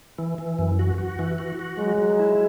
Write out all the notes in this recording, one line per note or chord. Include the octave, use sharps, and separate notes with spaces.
E3
E3
F#2
F#4
F#4
E3
F#4
F#4
F#3 G#3
F#3
E4